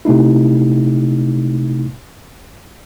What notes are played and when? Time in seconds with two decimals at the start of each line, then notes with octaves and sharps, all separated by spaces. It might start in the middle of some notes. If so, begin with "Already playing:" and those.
0.05 C3 A3 D#4 E4